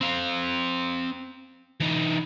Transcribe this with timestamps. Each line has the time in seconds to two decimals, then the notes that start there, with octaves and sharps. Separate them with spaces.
0.01 C4 F5
1.80 E3 D#4